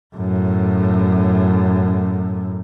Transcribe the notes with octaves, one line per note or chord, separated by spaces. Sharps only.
F#2 A2